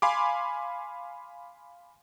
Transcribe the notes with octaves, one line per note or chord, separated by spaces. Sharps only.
F5 G#5 B5 C6 D6